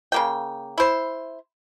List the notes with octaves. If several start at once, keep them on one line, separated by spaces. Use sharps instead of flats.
C#3 A#3 G5
E4 C5